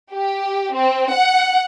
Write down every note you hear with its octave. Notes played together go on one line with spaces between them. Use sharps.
G4
C4
F#5